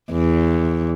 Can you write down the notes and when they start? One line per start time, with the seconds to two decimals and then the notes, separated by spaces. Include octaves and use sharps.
0.12 E2